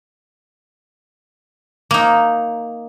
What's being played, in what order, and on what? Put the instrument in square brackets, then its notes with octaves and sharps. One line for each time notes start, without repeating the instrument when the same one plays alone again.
[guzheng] A#3 D#4